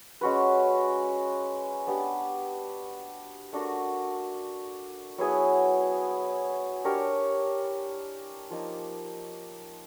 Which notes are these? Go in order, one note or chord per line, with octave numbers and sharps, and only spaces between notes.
G#3 C#4 F#4 B4
B3 D4 G4
A3 D4 F#4 A#4
F#3 B3 E4 G#4
D4 G4 A#4 C#5
F3 A#3 D#4